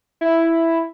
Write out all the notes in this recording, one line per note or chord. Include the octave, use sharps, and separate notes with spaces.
E4